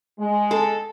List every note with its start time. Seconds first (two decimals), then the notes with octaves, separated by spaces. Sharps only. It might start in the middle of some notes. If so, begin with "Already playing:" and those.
0.19 G#3
0.51 A4